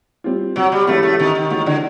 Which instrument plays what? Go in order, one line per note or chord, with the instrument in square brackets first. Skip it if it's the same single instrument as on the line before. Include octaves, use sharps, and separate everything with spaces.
[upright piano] G3 C4 F4
[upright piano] C3 [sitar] F#3
[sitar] G3
[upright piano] E3 G#3 C#4 F#4 [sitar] A3
[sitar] A3
[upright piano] C3 [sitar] D#3
[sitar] D#3
[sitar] D#3 [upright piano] E3 G#3 C#4 F#4
[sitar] D3